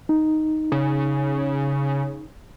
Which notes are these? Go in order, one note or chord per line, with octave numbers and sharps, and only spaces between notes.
D#4
C#3